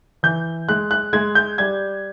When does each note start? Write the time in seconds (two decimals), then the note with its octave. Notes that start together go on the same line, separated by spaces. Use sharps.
0.23 E3 G6
0.68 G#3 F#6
0.91 F#6
1.13 G#3 G#6
1.35 G6
1.58 G3 G#6